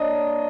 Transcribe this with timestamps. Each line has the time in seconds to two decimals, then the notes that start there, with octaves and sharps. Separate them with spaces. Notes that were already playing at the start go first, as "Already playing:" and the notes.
Already playing: A#3 D4 C#5 D#5